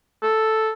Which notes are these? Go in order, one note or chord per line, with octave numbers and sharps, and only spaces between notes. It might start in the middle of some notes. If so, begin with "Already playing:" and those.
A4